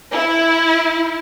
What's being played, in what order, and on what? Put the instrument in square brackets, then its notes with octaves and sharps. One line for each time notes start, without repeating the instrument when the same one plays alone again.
[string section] E4